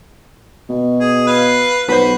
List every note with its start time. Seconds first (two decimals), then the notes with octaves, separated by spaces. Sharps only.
0.69 B2
1.00 G#4
1.27 B4 F5
1.88 B1 F#4 B4 C5